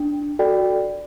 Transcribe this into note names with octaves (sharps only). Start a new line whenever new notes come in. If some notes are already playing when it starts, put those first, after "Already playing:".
Already playing: D4
F#4 A4 D5 G5